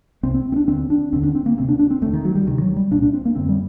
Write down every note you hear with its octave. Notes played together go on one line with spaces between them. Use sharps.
C2 C3 C4
C4
C4
D4
D#2 D3 C4
D4
D#2 D3 C4
D4
C4
A#3
D2 C3 C4
D4
D4
C4
D#2 D3 A3
D#3
F#3
G3
D2 C3 D#3
F#3
G3
C2 A#2 D4
D4
C4
A#3
F#2 D3 C4
G3